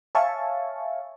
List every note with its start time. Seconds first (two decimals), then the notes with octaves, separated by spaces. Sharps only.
0.15 C#5 E5 F5 G#5 A5 C#6